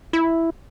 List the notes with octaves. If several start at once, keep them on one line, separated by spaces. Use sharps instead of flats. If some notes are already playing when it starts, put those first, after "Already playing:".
E4